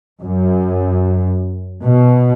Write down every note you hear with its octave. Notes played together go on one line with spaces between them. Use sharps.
F#2
B2